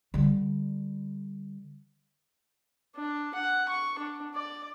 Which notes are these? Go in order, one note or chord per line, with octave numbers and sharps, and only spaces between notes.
D3 G3
D4
F#5
C#6
D4
D5